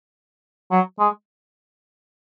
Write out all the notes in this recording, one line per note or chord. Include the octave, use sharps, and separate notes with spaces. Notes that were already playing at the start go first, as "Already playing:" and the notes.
F#3
G#3